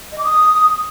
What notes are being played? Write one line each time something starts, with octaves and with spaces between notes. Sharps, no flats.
D#5
D6
D#6